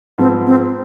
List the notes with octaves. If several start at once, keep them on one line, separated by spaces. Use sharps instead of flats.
G#2 F3 B3 C4
C4